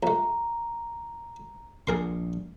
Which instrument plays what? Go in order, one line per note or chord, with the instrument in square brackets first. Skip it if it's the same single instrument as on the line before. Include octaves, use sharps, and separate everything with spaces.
[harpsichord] A#1 A3 [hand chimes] A#5
[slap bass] A#1 A#2 [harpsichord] G#4 A#4 C6